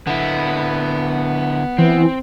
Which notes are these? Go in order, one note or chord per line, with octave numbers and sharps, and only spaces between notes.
D3 B3 E4
E3 C4